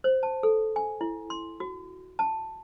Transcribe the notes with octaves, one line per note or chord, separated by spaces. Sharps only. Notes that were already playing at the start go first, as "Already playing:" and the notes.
C5
A5
A4
G#5
E4
C6
F#4
A5